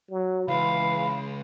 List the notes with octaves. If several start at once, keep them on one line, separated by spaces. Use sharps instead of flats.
F#3
C#2 E3 F5 B5